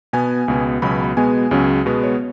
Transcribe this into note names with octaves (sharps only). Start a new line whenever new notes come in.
B2 B3 G#5
C#2 B2 B3
C#2 B2 F#3 C#4 B5
B2 G#3 B3 G#5
C#2 C#3 F#3 C#4
B2 G#3 B3
C#5